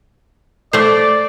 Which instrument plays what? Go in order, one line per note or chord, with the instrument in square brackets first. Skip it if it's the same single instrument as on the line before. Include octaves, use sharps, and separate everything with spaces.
[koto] A3 C5 [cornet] D5